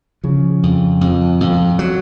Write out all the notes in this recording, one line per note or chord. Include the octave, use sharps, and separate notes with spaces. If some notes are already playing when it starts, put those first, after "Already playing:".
C#3 F3
F2
F2
F2
F#3